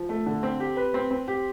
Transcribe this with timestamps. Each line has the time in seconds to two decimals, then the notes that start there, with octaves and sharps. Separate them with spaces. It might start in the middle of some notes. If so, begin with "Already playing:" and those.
Already playing: F3
0.09 A3
0.26 D3
0.43 C4
0.60 G4
0.77 B4
0.94 C4
1.11 C4
1.28 G4